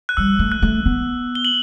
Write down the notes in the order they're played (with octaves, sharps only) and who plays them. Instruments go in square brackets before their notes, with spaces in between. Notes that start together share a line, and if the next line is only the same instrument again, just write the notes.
[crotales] F#6
[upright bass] G3 [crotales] E6
[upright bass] A3
[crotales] F#6
[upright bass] A3
B3
[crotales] G7
F#7